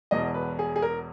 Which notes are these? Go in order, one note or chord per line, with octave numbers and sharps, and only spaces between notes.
E1 E2 B2 D#5
B4
G#4
G#4
A#4